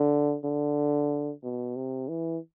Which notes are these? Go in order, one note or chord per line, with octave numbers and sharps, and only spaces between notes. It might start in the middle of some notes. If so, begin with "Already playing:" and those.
Already playing: D3
D3
B2
C3
E3